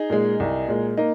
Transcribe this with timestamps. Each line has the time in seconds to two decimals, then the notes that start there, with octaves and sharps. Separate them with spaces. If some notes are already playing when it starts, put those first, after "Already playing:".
Already playing: D#4 G#4
0.10 A#2 G#3
0.40 C2
0.68 A#2 G#3
0.97 A#3 D#4